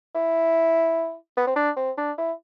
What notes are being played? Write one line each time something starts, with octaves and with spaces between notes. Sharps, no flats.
E4
B3
C4
D4
C4
D4
E4